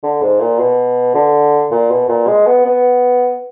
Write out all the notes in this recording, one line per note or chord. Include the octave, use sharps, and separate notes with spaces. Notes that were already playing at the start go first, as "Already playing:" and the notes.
D3
G#2
A#2
B2
D3
A#2
B2
A#2
G#3
B3
B3